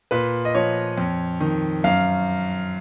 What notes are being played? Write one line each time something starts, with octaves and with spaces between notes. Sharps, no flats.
A#2 B4
D#5
F3 C#5
F2
D#3
F#2 F5